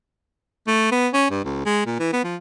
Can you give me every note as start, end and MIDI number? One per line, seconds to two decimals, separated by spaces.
0.67 0.89 57
0.91 1.08 59
1.13 1.26 61
1.31 1.41 43
1.44 1.64 37
1.65 1.83 56
1.86 1.99 46
1.99 2.08 52
2.13 2.23 59
2.24 2.36 53